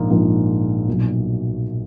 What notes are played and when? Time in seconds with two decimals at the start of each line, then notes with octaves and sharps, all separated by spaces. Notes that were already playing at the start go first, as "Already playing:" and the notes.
Already playing: A#1 G#2 F3 A#3 F4
0.10 A#1 G#2 F3 A#3 F4
0.87 B1 A#2 F#3